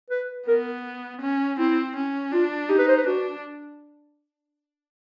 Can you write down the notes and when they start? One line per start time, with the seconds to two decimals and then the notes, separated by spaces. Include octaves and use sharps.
0.10 B4
0.48 B3 A#4
1.21 C#4
1.58 C4 E4
1.96 C#4
2.32 D4 F4
2.69 D#4 G4
2.78 B4
2.88 C5
2.97 B4
3.06 D4 F#4